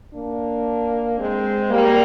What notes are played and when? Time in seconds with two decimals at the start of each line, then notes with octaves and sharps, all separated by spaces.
0.13 A#3 D4
1.17 G#3 C4
1.70 G3 A#3